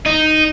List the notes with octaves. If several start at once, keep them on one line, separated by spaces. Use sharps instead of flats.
D#4